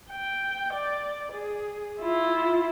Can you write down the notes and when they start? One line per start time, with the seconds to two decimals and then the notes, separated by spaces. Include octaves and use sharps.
0.11 G5
0.73 D5
1.32 G#4
2.00 E4 F4